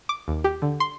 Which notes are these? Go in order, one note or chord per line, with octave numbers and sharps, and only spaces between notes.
D6
D#2
G4
D3
C6